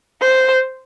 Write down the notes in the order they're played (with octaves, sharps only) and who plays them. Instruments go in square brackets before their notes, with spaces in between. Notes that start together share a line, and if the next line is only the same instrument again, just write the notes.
[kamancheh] C5